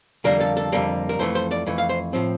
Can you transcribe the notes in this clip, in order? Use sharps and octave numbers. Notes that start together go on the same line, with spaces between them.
F2 D3 G3 A#3 A#4
A4
A4
F2 D3 G3 A#3
A#4
F2 E3 A3 C5
C5
D5
F2 E3 A3
F5
C5
A2 F3 C4